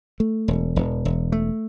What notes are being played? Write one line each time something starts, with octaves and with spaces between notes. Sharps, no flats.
A3
E1
E1
E1
A3